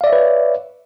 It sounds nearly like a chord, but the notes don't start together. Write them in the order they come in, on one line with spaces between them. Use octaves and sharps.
F5 D5 E5 C#5 B4